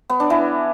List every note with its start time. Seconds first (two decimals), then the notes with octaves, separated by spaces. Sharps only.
0.10 B3
0.20 D4
0.30 E3